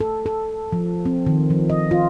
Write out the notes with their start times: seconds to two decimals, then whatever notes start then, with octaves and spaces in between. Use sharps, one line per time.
0.01 A4
0.26 A4
0.73 F3
1.05 C4
1.27 D#3
1.50 F3
1.70 D#5
1.91 F4